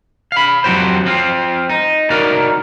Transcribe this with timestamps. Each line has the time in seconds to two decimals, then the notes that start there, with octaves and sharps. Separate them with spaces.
0.32 F5 B5
0.64 F2 F#3 F#4 G4 C5
1.05 F3 C4 F4
1.69 D#4
2.10 D#4 F#4 A#4 D5 F5